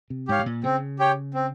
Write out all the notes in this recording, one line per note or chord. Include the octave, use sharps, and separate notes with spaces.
C3
G#2 G4 C#5 F5
G#2
A#2
C#3 C4
G4 C#5 G5
C4